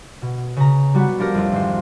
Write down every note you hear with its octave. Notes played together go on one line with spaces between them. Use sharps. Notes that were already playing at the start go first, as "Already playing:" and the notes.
B2
C#3 A#5
G3 B3 F#4
F3 D4 G4 A#4
F2 A3 F4
G#1 C5